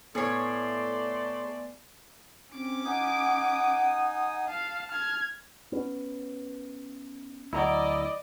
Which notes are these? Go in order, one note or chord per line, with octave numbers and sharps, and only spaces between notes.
A2 A3 B3 C#5 D5 G#5 C6 C7
C4 C#4 D6
D#4 F#5 G#5 D#6
F5 A5
F6 G#6
B3 C#4
D2 F#3 E4 D5 D#5 A#5